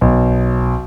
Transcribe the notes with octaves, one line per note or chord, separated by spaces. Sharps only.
B1